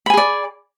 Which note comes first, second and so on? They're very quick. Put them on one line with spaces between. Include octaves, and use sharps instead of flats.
B5 G#5 G#4 D5